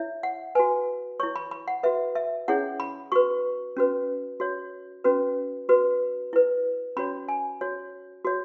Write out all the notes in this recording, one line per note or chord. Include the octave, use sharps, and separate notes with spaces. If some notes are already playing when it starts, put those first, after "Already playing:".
Already playing: E4 C#5 E5
F#5
F#4 B4 G#5
E4 C#5 C#6
B5
B5
F#5
F#4 B4 E5
E5
C#4 E4 G#4 C#5 F#5
B5
F#4 B4 C#6
C#4 F#4 B4
F#4 C#5
C#4 F#4 B4
F#4 B4
E4 B4
C#4 F#4 C#5 B5
G#5
F#4 C#5
F#4 C#5